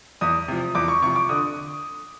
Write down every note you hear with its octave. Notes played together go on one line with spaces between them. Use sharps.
E2 D#6
C3 F3
E2 D6
C#6
C3 F3 C#6
D6
D3 D#6